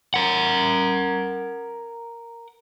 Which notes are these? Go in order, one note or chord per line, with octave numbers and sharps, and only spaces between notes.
A#4 F#5